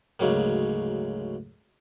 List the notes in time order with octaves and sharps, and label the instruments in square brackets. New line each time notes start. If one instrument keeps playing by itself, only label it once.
[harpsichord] D2 G#2 C#3 F#3 A#3